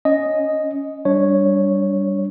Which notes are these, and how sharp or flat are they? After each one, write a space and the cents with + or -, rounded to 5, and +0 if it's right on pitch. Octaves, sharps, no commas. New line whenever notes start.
C#4 +0 D#5 +0
G3 +0 D4 -20 C#5 +0